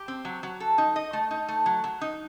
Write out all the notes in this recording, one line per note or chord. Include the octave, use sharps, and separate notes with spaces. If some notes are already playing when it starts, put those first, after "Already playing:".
Already playing: G4
C4
F#3
F#3
A4
D#4
D#5
A3
D#4
A3
F#3
F#3
D#4